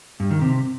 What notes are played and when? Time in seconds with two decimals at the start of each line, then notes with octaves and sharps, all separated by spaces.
0.20 G2
0.31 D#3
0.41 C3